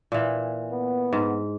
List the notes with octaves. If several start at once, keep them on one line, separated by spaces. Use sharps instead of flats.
A#2 E3
B3
G#2